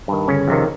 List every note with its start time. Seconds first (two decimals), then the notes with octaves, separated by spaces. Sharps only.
0.08 G2 D#3
0.28 G1 C#3 C#4
0.48 F2 C3 D#3